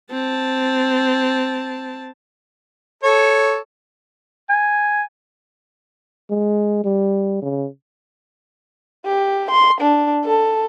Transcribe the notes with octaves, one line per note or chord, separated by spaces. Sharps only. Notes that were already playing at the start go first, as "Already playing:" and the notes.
C4 A5
A4 C#5
G#5
G#3
G3
C#3
G4
C6
D4
A4